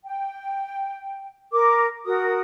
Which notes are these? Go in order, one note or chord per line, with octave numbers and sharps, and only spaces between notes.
G5
A#4 D6
F#4 A#4 D#6